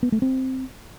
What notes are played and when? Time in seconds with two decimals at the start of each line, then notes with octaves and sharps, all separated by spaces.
0.03 B3
0.12 A3
0.22 C4